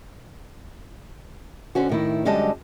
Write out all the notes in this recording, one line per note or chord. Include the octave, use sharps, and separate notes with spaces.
D3 C4 C#4 F#4
A2 D#3 E4
F#2 D3 G3 G#3 D#5 A5